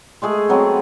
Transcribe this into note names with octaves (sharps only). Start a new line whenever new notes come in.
G#3 A3 G#4
F#3 B3 C4